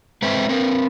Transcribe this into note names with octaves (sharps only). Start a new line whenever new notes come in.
G#3 C4 B4 C5 E5 G5
C4 A#4 B4